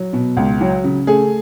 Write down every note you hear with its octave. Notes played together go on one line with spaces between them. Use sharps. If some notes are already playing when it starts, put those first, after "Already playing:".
Already playing: F#3
B2
C#2
F#3
C#3
A3 G#4